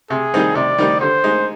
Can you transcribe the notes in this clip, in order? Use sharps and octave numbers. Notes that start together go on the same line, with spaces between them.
C3 G#4
D#3 G3 C4 D#4
C3 D5
D#3 G3 C4 D#4
D3 C5
G#3 D#4